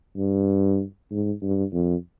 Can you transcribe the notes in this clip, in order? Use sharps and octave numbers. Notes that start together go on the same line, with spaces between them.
G2
G#2
G2
F2